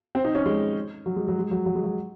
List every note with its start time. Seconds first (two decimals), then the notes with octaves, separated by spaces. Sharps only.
0.15 C4
0.24 D#4
0.35 C#4
0.46 G#3
1.06 F#3
1.16 G#3
1.28 F#3
1.39 G#3
1.51 F#3
1.66 F#3
1.75 G#3
1.84 F#3